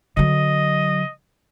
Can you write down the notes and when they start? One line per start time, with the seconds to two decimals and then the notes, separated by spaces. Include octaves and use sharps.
0.17 D3 F#3 D#5